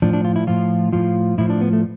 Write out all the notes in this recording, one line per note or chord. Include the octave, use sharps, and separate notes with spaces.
A2 F3 D4
D4
F4
E4
A2 F3 F4
A2 F3 F4
A2 F3 E4
D4
B3
A3